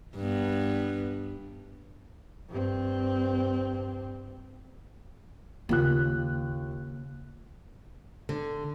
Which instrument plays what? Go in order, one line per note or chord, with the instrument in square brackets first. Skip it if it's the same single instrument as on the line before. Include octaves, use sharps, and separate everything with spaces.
[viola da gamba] G2 B3
[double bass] G2 C4
[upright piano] D#2 F4 F#6 [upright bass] C#3 A#3
[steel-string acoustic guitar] D3